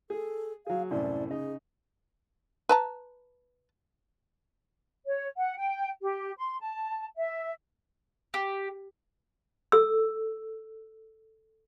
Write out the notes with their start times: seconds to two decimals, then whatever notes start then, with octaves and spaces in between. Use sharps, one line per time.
0.10 G#4 A4
0.67 F#3 G#4 F5
0.91 C2 F#2 A2 D5
1.30 C#3 D#4 G#4
2.69 B4 A5 A#5
5.06 C#5
5.37 F#5
5.57 G5
6.02 G4
6.37 C6
6.60 A5
7.16 E5
8.34 G4
9.72 A4 E6